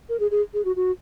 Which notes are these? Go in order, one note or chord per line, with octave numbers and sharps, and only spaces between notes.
A#4
G#4
G#4
G#4
F#4
F#4